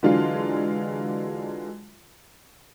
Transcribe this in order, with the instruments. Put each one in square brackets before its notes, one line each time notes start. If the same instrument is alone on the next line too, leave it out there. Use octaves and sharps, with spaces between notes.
[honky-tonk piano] D3 E3 F#3 G#3 D4 F4